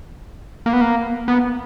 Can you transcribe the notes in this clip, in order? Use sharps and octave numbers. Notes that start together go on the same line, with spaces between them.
A#3
B3
A#3
B3